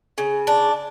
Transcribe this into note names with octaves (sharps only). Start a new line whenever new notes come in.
C#3
D4